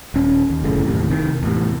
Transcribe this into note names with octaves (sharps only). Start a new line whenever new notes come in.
D#1 C#4
D#2
G1 F#2 A2 C#3
D#2 A2 C3
F1 C3 D#3
E2 A2 C3